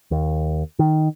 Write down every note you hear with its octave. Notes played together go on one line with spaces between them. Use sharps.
D#2
D#3